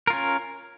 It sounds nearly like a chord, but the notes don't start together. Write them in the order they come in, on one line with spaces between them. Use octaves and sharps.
A#4 F4 C#4